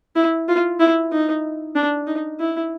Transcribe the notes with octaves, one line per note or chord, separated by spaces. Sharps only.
E4
F4
E4
D#4
D4
D#4
E4